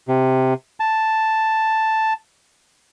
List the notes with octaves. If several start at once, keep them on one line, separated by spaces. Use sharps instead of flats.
C3
A5